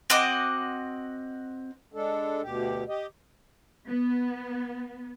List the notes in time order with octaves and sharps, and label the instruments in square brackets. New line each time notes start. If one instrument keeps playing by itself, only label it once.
[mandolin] C4 F#4 D#5 D6
[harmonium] G#3 D4 A4
D2 B2 G4
G4 D#5
[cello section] B3